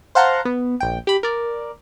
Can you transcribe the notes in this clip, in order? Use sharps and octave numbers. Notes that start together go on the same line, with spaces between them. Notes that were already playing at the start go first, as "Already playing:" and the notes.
C5 F5 F#5 A5 A#5 C6
B3
A#1 G5
G4 B5
A#4 D5